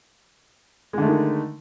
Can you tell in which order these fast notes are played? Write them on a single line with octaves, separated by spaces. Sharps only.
G#3 D3 A3 D#3 D#4